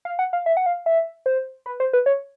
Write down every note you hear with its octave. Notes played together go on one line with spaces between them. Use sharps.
F5
F#5
F5
E5
F#5
F5
E5
C5
B4
C5
B4
C#5